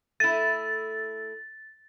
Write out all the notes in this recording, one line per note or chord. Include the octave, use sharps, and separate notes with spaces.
A3 E4 A6